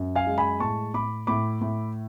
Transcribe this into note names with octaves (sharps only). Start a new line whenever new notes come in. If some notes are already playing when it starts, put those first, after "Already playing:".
Already playing: F#2
F5 G#5
G#3
G#5 B5
A2 A5 C#6
A2 B5 D6
A2 B5 D6
A2